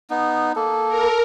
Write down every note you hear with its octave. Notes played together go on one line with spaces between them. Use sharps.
B3 D#4
A#3 A4
A#4